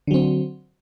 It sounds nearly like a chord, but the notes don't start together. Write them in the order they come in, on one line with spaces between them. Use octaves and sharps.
D3 F#3 C4